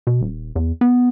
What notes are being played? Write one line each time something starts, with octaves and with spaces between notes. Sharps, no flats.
B2
D#1
E2
B3